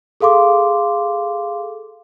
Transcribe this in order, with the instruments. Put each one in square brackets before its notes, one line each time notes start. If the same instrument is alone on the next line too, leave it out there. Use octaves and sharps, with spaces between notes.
[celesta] G#4 A4 F5 C6 D6